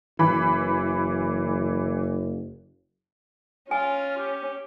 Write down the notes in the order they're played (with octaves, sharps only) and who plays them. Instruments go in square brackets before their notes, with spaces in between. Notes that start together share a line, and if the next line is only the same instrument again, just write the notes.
[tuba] F#1 [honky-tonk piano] E3 B5
[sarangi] C#4 [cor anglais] F4 [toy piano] G#5
[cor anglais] G4